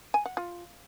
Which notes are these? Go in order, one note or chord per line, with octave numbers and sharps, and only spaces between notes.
G#5
F#5
F4